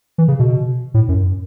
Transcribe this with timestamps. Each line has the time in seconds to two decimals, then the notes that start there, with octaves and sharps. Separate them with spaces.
0.18 E3
0.28 C#3
0.39 B2
0.94 A2
1.09 F#2